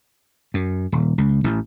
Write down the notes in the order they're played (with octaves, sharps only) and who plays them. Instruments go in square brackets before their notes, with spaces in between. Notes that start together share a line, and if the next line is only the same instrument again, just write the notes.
[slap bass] F#2
D#1
C#2
A1